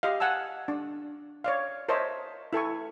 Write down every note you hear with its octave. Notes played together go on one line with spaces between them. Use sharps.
G4 D#5 F5
F5 F#5 G#5 A5 E6
D4
C#5 D5 F5
A#4 C5 C#5 D#5 E5 A5
E4 A4 G#5 C#6